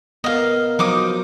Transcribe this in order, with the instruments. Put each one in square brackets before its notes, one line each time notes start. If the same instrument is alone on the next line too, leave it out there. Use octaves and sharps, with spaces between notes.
[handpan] B3 A#4 [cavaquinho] D#5 F5
[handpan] F3 F#3 C5 [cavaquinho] D#4 D6 D#6